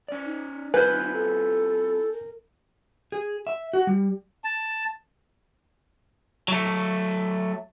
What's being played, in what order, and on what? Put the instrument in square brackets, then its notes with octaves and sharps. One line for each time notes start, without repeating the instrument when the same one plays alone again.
[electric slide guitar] C#4 D5
[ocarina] D#4
[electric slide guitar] C4 E4 F4 [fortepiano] B4 [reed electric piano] G#5 G6
[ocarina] A4
A#4
[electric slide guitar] G#4
E5
F#4
G3
[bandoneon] A5
[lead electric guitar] F#3 A3